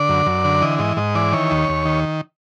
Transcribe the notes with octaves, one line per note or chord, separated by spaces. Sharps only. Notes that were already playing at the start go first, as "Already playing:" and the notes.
Already playing: D3 D5
F#2
F#2
D3
E3 D#5
G#2 D#5
G#2 D#5
E3 D5
D#3 C#5
D#2
D#2
D#3